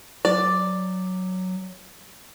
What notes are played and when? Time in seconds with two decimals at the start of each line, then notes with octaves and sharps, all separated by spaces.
0.25 F#3 D5